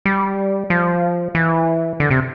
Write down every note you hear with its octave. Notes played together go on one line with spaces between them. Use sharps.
G3
F3
E3
D3
C3